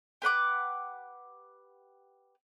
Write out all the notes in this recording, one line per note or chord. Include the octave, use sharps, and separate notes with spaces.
G4 B4 F#5 D6